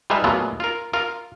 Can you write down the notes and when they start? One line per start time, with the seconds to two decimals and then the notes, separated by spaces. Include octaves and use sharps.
0.10 G3 G#3 D#4 F4 B4 E5
0.24 A#2 F#3 G#3 A3 B3 F4
0.60 F4 A#4
0.93 F4 A#4 F5